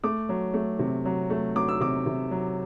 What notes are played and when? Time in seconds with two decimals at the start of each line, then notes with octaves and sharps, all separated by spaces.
0.04 A3 D6
0.29 F#3
0.54 A3
0.79 C3
1.05 F#3
1.30 A3
1.56 F#3 D6
1.68 E6
1.81 C3 D6
2.06 C3
2.31 F#3